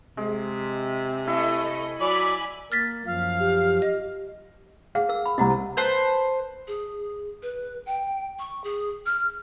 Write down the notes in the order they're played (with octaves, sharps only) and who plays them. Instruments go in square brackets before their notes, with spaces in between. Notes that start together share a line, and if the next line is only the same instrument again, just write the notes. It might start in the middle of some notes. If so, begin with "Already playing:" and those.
[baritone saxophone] C3 [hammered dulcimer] G#3
[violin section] A3 D#5 C#7 [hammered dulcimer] E4
[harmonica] F#3 D5 [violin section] G#5 B5
[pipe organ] A#3 [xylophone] F6 A6 B6
[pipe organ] F#2 F3 [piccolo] F5
[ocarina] G4
[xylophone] D#5
[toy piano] G#4 F#5 [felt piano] F5
[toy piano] A#4 E6
B5
[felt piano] C2 C3 [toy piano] D#5 F#5 A#5
[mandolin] B4 C5 A5 G6
[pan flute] G#4
B4
G5
C#6
G#4
F6